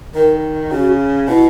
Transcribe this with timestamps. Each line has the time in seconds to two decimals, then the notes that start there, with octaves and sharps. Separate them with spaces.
0.15 D#3 A#4
0.71 C#3 F#4
1.28 B2 E4